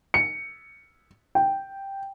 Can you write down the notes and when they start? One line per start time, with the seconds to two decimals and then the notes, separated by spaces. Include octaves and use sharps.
0.14 C#7
1.35 G5